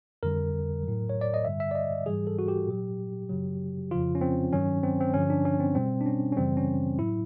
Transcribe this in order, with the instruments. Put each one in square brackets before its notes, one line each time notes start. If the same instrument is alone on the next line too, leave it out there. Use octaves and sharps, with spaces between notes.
[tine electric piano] F2 D3 G3 A#4
A2 F#3
C#5
D5
D#5
G2 D3 G3 E5
E5
D5
D#5
G#2 E3 G3 G#4
A4
F#4
G4
A#2 F#3
F#2 C#3 F#3
F2 C#3 F3 F4
C#4
C4
G2 D#3 F#3 C#4
C4
C4
G2 D3 F3 C#4
D4
C#4
C4
B2 G3 C4
D4
C#4
C#4
F#2 C#3 E3 G3 C4
C#4
A2 F#3 E4